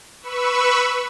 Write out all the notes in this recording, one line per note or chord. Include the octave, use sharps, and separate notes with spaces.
B4 B5 C#6 E6